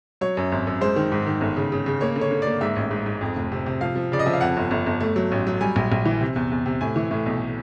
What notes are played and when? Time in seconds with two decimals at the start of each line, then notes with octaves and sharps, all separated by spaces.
0.21 F#3 C#5
0.37 F#2
0.52 G#1
0.67 F#2
0.81 G#3 C5
0.96 D#3
1.12 G#2
1.26 D#3
1.41 G1
1.57 C#3
1.72 C#3
1.86 C#3
2.01 A#3 C#5
2.16 D3
2.21 C#5
2.31 D3
2.42 D5
2.47 A#3
2.61 G#2 E5
2.76 A1
2.91 G#2
3.06 G#2
3.21 F2
3.37 F1
3.52 C3
3.66 C3
3.81 F3 F5
3.96 F3
4.12 C#3 D5
4.19 D#5
4.26 F3 E5
4.33 F5
4.41 F2 F#5
4.57 G1
4.71 G1
4.86 G1
5.00 A3
5.16 F#3
5.31 A1
5.47 F#3
5.61 G3 G#5
5.76 A#1
5.92 A#1
6.06 E3
6.21 C3
6.36 E2
6.52 E2
6.66 C3
6.81 A2 G#5
6.96 E3
7.11 A2
7.26 B1